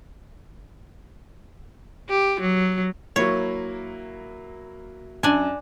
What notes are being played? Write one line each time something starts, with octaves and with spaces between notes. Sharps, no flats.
G4
F#3
F#3 A#3 E4 C#5
F#2 D4 G#5